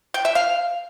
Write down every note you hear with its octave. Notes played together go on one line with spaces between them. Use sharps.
G5
E5
F5